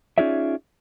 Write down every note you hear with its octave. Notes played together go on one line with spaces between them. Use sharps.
C#4 D#4 F4 G#4 D5 E5